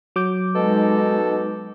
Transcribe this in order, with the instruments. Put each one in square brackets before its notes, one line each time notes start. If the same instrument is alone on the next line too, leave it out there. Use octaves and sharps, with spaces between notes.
[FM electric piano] F#3 D6 G6
[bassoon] B2 [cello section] G#3 D#4 [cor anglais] A4